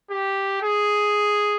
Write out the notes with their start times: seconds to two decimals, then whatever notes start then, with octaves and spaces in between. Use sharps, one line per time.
0.10 G4
0.62 G#4